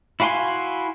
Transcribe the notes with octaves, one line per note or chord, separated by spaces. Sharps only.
E4 F#4 F5 G#5 C6